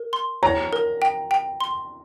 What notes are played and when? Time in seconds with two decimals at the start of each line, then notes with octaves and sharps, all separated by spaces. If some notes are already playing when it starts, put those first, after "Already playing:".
Already playing: A#4
0.13 C6
0.43 C#5 A#5
0.73 A#4
1.02 G5
1.31 G5
1.61 C6